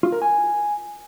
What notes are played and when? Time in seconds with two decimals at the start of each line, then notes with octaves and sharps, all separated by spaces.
0.03 F4
0.12 A#4
0.22 G#5